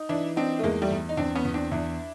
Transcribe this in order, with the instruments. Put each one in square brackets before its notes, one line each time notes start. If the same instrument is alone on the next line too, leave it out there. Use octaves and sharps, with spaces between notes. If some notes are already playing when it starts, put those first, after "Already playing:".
Already playing: [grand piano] D#4
[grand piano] E3 [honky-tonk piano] D4 E4
[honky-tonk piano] C4 D4 [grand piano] D#4
[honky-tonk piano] A3
[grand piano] E2 [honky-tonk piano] G#3 A#3
[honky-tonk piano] G3 A3
[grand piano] E2
[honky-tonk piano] D#4
[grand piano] E2 [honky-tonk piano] C4 D4
[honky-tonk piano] B3 C#4
[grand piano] E2
[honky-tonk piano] C4 D4
[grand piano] E2 [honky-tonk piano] D4 E4